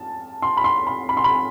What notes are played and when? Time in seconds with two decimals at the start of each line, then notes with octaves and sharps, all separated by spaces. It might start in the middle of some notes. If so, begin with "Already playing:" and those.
Already playing: A5
0.42 C6
0.57 B5
0.64 C6
0.87 B5
1.09 B5
1.17 C6
1.24 B5